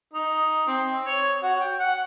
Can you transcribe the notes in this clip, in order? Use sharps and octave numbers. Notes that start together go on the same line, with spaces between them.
D#4
C4
C#5
F#4
G5
F#5